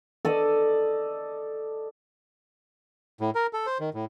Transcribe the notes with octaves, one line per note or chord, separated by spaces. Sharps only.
A4 D5 D#5
A2
A#4
A4
C5
D#3
A2